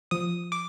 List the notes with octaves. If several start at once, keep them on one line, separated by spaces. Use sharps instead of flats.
F3 D#6
D6